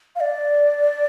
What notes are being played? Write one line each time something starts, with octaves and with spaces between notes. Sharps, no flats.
F5
D5